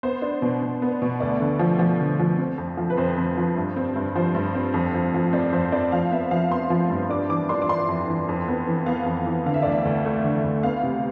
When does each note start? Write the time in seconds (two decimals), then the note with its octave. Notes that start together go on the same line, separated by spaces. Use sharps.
0.03 B3 C5
0.22 D4
0.42 B2
0.62 B2
0.82 B3
1.02 B2
1.20 D2 D5
1.40 D3
1.59 F3
1.79 F3
2.00 D3
2.20 F3
2.39 C4
2.58 F2
2.77 F3
2.90 B4
2.97 F2 C5
3.18 F2
3.37 F3
3.57 G2
3.76 C4
3.96 G2
4.16 F3 C5
4.35 G2
4.55 C4
4.74 F2
4.94 F3
5.14 F3
5.33 C4 D5
5.52 F2 C5
5.72 C4 D5
5.92 F3 F5
6.11 B3 E5
6.31 F3 F5
6.50 B3 C6
6.70 F3
6.90 G2
7.09 D4 D6
7.29 E3 D6
7.49 D4 C6
7.62 D6
7.69 D4 C6
7.88 F2
8.08 E3
8.28 F2
8.48 B3
8.67 E3
8.86 B3 F5
9.06 F2
9.26 E3
9.46 D3 F5
9.54 E5
9.62 D2 D5
9.72 E5
9.85 D2
10.05 A3
10.24 D3
10.44 D2
10.63 B3 F5
10.83 C3